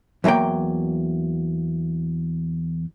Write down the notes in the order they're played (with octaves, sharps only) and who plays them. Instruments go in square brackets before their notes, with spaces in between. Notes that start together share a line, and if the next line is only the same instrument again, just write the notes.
[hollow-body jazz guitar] E2 E3 F#3 A#3 G5